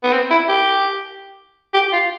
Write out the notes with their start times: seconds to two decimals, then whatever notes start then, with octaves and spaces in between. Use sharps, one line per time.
0.04 B3
0.13 C4
0.31 E4
0.49 G4
1.74 G4
1.92 F4